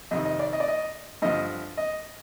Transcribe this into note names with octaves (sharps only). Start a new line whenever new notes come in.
F2 C3 D#3 D#5
D#5
D5
D#5
D5
D#5
G2 D3 F3 D#5
D#5